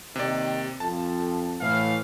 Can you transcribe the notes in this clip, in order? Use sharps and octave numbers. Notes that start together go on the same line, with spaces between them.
D#2 C3 D#3 G4 D5
F2 A5
A2 E3 F5